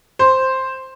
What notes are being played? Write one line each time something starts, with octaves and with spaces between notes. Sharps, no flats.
C5